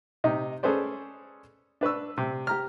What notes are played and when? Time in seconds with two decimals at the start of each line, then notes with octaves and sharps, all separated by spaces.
0.24 C3 D#4
0.63 C#4 G#4 A4 B4 C5 D5
1.81 D4 B4 C#6 E6
2.18 C3
2.47 G4 A#5 F6